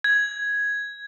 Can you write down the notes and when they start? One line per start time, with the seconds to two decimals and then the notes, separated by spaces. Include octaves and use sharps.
0.04 G#6